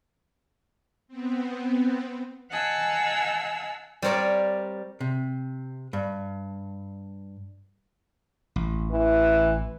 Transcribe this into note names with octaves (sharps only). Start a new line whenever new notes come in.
B3 C4
D#5 F5 F#5 G#5 A5 E6
G3 C4 A#4 C#5 D5
C3
G2
A1
E3